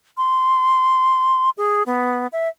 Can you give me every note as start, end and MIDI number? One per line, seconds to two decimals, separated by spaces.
0.17 1.50 84
1.57 1.83 68
1.86 2.27 59
2.33 2.48 76